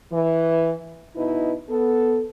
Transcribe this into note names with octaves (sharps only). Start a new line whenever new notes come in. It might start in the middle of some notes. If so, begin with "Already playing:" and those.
E3
B2 D#4 E4 B4
B3 A4